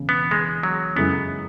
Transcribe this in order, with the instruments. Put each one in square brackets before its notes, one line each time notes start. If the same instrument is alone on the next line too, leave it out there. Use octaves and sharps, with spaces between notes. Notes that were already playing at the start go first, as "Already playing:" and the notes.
Already playing: [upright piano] E1 E2 C#3
[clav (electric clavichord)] B3
G#3
F#3
[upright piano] F#2 C#3 G#3 E4 [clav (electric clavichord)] B3